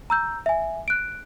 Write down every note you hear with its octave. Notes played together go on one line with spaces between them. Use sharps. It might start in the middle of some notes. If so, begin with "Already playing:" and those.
A#5 E6 G6
E5 G#5
F#6 D7